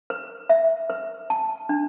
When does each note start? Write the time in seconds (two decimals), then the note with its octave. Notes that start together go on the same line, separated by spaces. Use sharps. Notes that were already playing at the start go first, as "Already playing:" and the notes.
0.10 B4
0.49 E5
0.90 B4
1.30 A5
1.69 D4